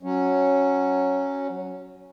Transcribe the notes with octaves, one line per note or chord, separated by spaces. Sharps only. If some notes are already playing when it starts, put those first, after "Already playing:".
F#3 C#4